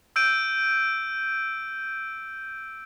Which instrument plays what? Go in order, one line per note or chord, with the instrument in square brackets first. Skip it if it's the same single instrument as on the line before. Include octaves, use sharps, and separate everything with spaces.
[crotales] E6 G6 D7 D#7